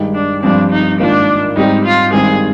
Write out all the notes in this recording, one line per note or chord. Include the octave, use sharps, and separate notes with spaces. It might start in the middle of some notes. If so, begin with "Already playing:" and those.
Already playing: G2 D#3 G#3 D#4 G4
D4
G2 F3 C4 D4
D#4
G#2 D#3 A#3 D4 F4
G#2 G3 C4 D#4 G4
F4
G2 D#3 G#3 C4 G#4